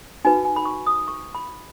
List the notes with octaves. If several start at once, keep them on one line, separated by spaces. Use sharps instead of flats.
D#4 F#4 B4 G#5
G#5
B5
C#6
D#6
C#6
B5